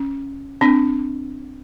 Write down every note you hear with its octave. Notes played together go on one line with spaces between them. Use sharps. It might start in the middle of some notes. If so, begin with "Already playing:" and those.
Already playing: C#4
C4 D4